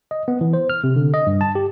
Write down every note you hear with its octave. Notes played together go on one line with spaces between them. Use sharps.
D#5
B3
E3
C5
F6
C3
D3
D#5
G2
A5
G4